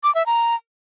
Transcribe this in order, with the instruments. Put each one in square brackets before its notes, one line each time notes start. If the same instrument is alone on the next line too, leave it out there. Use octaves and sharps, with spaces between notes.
[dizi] D6
E5
A#5